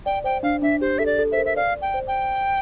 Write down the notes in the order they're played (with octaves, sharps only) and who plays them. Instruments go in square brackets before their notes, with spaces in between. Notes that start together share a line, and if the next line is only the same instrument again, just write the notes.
[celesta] D5 [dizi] G5
[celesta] C5 [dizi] G5
[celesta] D4 [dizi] F5
[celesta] D4 [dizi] E5
[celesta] G4 [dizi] C5
[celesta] A4 [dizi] E5
[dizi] D5
[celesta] A4
[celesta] C5 [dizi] E5
[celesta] A#4
[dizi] E5
[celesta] D5 [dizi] F5
[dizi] G5
[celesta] C5
[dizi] G5